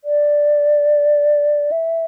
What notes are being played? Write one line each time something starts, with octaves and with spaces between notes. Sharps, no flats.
D5
E5